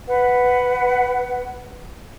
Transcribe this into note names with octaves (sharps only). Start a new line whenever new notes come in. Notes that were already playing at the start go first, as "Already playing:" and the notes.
B4 F#5